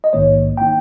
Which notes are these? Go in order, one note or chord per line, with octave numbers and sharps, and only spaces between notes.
D#5
A#1 G#2 D#3 A#3 D#4 C#5
D#3 A#3 D#4 G5